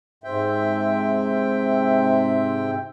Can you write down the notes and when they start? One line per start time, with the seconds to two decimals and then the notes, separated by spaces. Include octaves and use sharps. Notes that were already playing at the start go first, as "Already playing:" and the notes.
0.24 G#2 C3 C4 E5 G5